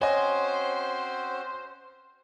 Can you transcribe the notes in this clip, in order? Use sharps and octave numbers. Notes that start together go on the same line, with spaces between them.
C4 C#4 F#4 C5 C#5 D#5 G#5